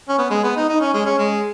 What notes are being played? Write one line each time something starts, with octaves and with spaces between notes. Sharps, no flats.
C#4
B3
G#3
B3
D#4
D#4
C#4
G#3
C#4
G#3